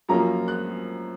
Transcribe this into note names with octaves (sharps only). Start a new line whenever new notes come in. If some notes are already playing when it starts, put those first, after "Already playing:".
F#2 F3 A#3 C#4 F4 A#5
F#6